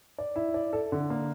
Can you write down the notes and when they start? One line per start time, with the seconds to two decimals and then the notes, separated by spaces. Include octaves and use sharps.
0.18 D5
0.36 E4
0.54 D5
0.73 A4
0.92 D3
1.10 A#3